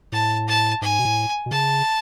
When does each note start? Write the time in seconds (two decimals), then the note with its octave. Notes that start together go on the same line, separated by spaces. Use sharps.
0.12 A2 A5
0.48 A5
0.81 G#2 G#5
0.99 B2
1.05 A2
1.46 B2
1.51 C#3 A5